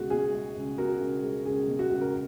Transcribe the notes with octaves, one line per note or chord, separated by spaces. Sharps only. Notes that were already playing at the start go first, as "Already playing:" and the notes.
Already playing: C#2 B2 G#3 F#4
B2 G#4
G#3
C#2
B2 F#4 A#4
C#2
G#3
C#2 G#4
B2
F#4
C#2
A#4